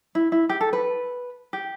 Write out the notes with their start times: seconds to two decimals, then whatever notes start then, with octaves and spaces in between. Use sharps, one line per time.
0.15 E4
0.32 E4
0.49 G4
0.61 A4
0.73 B4
1.53 G4